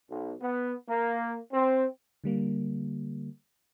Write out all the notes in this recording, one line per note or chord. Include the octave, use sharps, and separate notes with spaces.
B1
B3
A#3
C4
D3 G3 A#3